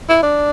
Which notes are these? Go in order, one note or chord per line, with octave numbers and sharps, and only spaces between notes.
E4
D4